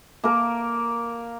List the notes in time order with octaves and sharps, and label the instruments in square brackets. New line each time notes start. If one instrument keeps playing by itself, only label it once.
[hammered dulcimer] A#3 A#4